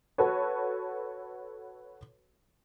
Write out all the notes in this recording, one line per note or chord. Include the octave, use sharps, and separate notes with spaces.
F#4 A4 B4 C#5